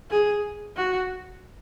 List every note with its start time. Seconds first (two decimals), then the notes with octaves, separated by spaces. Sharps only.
0.11 G#4
0.77 F#4